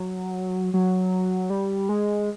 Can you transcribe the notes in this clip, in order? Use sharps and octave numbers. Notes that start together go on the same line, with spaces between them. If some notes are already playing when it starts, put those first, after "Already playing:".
Already playing: F#3
F#3
G3
G#3